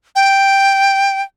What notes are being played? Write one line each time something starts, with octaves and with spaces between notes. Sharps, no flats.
G5